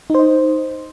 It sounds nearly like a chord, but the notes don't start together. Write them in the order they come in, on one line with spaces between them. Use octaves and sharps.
D#4 C5 D#5